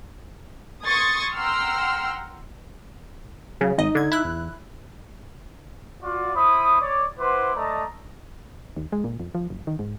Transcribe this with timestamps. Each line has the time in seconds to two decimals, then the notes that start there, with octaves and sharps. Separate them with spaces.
0.84 C6 C#6 D#6 G#6 A6
1.36 F#5 G5 A#5 C6 E6 F6
3.61 C#3 F#3
3.78 G#1 D#4 D#5
3.95 D3 G#6
4.12 E4 F#6
4.25 E2
6.02 F4 F#4 D5
6.34 E4 C5 B5 D#6
6.81 C#5 D5 D6
7.19 E4 B4 C5 F#5 C6 D6
7.56 A3 D5 D#5 A5 A#5
8.77 D#2
8.92 G#3
9.04 A#2
9.20 F2
9.35 F3
9.50 F#1
9.67 D#3
9.79 G#2